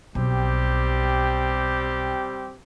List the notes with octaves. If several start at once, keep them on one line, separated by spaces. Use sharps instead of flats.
B1 G3 C4 G4